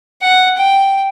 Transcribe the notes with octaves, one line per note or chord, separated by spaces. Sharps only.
F#5
G5